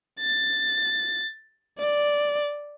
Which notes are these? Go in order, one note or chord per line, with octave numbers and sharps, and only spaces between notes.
A6
D5